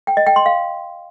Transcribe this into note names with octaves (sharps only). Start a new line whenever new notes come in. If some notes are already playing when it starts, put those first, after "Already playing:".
G5
D#5
G5
C6
F5